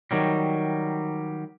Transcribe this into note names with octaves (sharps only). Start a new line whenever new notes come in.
D#3 F#3 G3